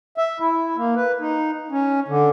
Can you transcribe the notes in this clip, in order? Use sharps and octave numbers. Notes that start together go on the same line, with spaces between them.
E5
E4
A#3
B4
D#4
C#4
D3